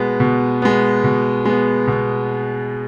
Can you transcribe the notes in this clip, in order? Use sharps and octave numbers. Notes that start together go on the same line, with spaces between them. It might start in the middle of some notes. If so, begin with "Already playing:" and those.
Already playing: B2 G#3 B3
B2
G#3 B3
B2
G#3 B3
B2